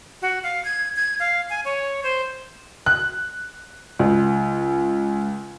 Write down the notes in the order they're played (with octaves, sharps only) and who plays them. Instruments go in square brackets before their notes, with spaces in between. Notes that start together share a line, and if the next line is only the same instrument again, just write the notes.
[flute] F#4
F5
G#6
G#6
F5
G#5
C#5
C5
[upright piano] F#6
C#2